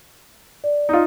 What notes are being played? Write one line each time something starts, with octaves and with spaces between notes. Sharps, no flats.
D5
D#4 F4